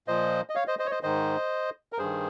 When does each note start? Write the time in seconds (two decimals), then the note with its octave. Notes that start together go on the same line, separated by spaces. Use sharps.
0.08 A#2 F3 C5 D#5
0.49 D#5
0.55 C#5 F5
0.67 C5 D#5
0.79 C5 D#5
0.86 C#5
0.91 C5 D#5
1.03 G#2 D#3 C5 D#5
1.92 A#4
1.98 G2 D#3 G#4 C5